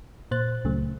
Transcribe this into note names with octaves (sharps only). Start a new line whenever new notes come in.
A#2 C5 F#6 A6
C#2 C#3 F#3 A3